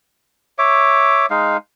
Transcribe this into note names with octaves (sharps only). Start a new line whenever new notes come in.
C#5 E5 D6
G#3 D#4 F5